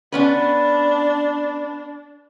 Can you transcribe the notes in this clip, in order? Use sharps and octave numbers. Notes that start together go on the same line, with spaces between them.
B3 C#4 D4 B4